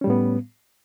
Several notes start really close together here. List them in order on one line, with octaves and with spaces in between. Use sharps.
C#4 G3 A2 B3